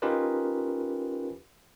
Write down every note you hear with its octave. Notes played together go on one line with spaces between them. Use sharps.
C#4 D#4 F4 G4 A#4 B4